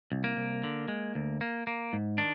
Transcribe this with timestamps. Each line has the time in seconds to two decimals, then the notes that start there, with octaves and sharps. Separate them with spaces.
0.12 C2
0.24 A#3
0.37 C2
0.64 D3
0.88 G#3
1.15 D2
1.41 A#3
1.67 A#3
1.93 G#2
2.18 D#3 D4